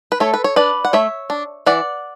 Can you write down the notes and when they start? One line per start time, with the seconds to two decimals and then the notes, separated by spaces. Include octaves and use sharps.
0.12 B4
0.20 A3 A4 C#5
0.34 B4
0.44 C#5
0.56 D4 B4 D5
0.85 F#5
0.93 A3 C#5 E5
1.30 D4
1.66 E3 D5 F#5